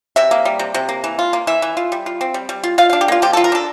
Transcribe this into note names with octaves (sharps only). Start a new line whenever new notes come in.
C3 E5
A#3
G3
C3
C3
A#3
E3
F4
A#3
E3 E5
E3
F4
G3
F4
C4
G3
G3
F4
F4 F5
D4 F5
G4
A#3 F4
F3 G4
F4 A4
A#4
D4 A4